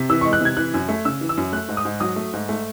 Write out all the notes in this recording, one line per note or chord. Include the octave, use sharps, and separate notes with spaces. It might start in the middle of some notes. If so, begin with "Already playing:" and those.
Already playing: C3
E3 E6
C#6
G#3
F#6
C3 G#6
E3 F#6
F#2
A3
C#3 E6
E3
E6
F#2
A3 F#6
G#2
D#6
G#2
F#3 D#6
A3
G#2
A3